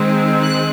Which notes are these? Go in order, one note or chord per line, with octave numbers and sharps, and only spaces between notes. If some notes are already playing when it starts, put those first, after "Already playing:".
Already playing: D#3 G#3 C4
F#6